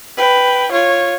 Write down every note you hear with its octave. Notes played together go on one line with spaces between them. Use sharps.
B4 G5
F4 C#5